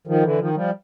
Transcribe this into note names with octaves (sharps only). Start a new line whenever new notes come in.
D#3 F3
D3 E3
D#3 F3
F3 G3